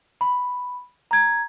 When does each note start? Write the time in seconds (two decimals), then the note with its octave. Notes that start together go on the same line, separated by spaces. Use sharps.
0.21 B5
1.11 A#5 G#6